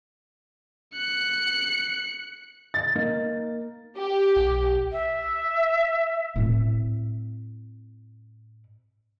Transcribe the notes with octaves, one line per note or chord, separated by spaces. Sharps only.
F#6 C#7
A6
A#3 D#4
G4
B1
E5
A2 C4